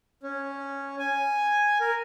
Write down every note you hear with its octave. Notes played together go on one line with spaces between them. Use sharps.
C#4
G#5
A#4